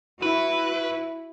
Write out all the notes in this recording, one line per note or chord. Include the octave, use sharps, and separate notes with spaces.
E4 F#4 B4